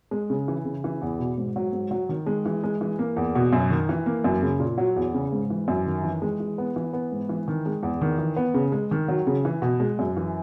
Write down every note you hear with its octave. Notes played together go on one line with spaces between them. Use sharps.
G#3
C#3
E3
C#3
E3
E2
B2
G#2
F#3
G#2
F#3
D#3
G#3
E3
G#3
E3
A#3
E2
B2
F#2
D#3
E3
A#3
F#2
C#3
A#2
F#3
E2
C#3
G#2
E3
F#2
D#3
E3
G#3
E3
B3
E3
B3
G#2
E3
D#3
G#3
E2
D#3
E3
B3
C#3
G#3
D#3
F#3
C#3
E3
B2
G#3
F#2
E3